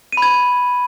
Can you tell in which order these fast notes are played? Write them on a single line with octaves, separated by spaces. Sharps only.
D#7 B5 G#6